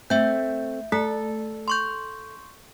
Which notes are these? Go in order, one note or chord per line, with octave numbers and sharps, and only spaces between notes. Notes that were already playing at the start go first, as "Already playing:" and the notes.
A3 C4 E5 G6
A3 A4
C6 C#6 G6